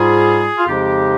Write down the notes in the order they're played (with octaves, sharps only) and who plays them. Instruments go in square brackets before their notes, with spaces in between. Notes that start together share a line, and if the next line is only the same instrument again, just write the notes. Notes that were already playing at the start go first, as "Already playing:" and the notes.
Already playing: [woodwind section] G#2 G3 F4 G#4
F4
F2 C#3 F3 G#3 D#4 G4